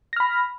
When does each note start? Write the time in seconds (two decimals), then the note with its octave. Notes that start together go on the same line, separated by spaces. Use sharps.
0.13 A#6
0.16 F6
0.20 B5